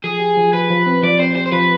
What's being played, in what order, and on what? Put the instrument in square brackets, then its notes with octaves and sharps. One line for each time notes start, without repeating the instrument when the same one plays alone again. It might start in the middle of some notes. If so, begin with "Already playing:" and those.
[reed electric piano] F3 [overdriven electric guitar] G#4
[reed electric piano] G4
F3
[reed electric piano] F3 [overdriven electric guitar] B4
[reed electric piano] F3
C4
[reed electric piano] F3 [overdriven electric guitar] D5
[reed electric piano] C4 [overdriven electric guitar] C5
[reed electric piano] G4 [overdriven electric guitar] C5
[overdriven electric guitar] C5
[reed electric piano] F3 [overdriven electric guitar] B4